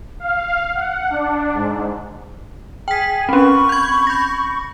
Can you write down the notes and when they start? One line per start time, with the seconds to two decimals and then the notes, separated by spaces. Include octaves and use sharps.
0.20 F5
0.75 F#5
1.10 D4
1.54 G#2
2.88 G#4 G5 B6
3.29 C4 C#4 B5 C#6
3.69 G6 G#6
4.07 G6 A#6